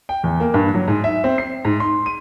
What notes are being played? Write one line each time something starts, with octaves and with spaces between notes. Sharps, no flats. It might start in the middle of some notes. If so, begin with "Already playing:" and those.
G5
E2
A#3
G2
F#3
G#2
E5
C4
C7
G#2
C6
D#7